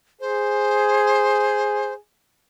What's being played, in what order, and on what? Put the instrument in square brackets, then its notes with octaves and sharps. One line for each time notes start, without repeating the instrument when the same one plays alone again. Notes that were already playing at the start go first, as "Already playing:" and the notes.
[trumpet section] G#4 [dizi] C5